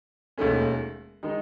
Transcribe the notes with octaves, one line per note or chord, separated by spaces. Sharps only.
E1 D#2 D#3 A3 C#4
D#3 G#3 D#4